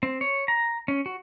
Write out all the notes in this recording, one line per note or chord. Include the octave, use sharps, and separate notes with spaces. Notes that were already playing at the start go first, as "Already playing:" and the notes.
C4
C#5
A#5
C#4
F#4